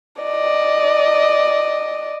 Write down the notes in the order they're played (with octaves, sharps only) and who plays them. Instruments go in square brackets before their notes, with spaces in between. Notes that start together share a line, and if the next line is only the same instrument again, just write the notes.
[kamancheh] D5 D#5